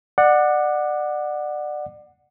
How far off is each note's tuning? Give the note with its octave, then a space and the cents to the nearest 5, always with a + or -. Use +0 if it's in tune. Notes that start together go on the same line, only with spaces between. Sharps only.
D5 +25 F#5 -5